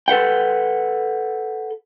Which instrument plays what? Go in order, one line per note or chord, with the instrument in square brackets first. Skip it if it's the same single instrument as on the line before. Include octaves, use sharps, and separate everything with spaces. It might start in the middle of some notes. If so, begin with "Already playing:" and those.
[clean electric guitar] A4 B4 F#5 G5